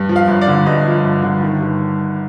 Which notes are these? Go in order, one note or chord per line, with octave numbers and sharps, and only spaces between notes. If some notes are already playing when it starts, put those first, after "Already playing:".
Already playing: G2
F3
F5
G1
D5
D3
G2 D#5
F3
G1
D3
D#3
G2